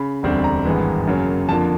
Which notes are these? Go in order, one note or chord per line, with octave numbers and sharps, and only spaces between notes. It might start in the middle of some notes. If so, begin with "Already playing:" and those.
Already playing: C#3 B5
E1 D2 D3 G3 C4
A#5
G#1 G2 E3 G#3 B3
F#2 C#3 F#3 A#3
F2 D3 F3 A#3 A5